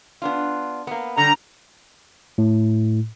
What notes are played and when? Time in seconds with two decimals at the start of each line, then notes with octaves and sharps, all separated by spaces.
0.22 B3 D4 F4
0.87 A#3 B3
1.17 D3 G3 A#5
2.38 A2